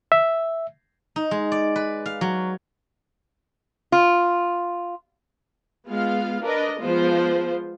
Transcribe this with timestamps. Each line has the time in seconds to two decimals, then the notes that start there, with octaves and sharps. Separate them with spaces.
0.12 E5
1.16 D#4
1.31 G#3
1.52 D5
1.76 B4
2.06 F5
2.21 F#3
3.92 F4
5.88 G#3 B3 F4 F5
6.44 D4 A#4 B4 D5 D#5
6.81 F3 G#3 B3 F4 C5